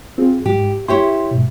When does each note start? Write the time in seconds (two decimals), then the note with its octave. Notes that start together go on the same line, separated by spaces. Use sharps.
0.18 C4 F4 G#4
0.46 G#2 G4
0.88 E4 G4 C#5 C6
1.31 G#2 B2